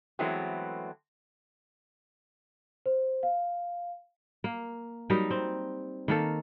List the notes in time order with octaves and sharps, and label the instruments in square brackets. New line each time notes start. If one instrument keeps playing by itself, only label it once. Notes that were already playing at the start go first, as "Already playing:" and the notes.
[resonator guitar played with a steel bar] E3 F#3 G#3 A3 B3 C4
[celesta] C5
F5
[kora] A#3
F#3 G3 D#4 A#4
C4
D#3 A#3 A4